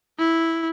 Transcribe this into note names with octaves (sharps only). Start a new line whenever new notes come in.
E4